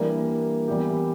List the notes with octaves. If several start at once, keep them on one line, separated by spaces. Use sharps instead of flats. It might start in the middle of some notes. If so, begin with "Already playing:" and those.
Already playing: E3 G3 A#3 D4
E3 G3 B3 E4 G4